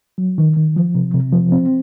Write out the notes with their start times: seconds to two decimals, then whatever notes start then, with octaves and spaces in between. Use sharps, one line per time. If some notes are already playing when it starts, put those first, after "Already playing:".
0.18 F#3
0.38 D#3
0.57 D#3
0.76 F3
0.95 C3
1.14 C3
1.33 F3
1.52 C4